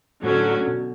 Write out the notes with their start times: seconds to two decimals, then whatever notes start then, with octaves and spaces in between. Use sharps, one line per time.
0.23 A2 D3 F#3 C#4 F#4
0.67 B2